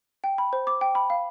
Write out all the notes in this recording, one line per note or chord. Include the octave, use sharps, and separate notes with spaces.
G5
B5
C5
D6
G5
B5
F5